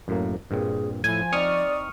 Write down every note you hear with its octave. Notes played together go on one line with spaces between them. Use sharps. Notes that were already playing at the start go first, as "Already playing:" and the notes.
F#2 A2 A#3
G2 A#2 C4 G#4
A2 F3 E4 G#5
C4 D#4 D5 C#6 D#6 F6